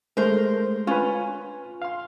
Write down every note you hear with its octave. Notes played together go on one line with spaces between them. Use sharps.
G#3 A3 A#4 C5
C#4 F4 B4
F5 C6